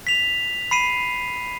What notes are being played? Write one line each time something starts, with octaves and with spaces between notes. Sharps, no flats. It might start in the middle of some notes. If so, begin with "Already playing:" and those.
B6 F7
B5 C7 D#7